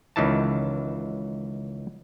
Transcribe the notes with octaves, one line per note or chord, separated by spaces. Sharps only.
C#2 D#3 E3 A5